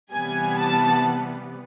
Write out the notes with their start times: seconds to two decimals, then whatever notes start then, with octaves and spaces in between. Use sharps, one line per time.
0.13 C3 E3 G3 B3 G#5
0.58 A5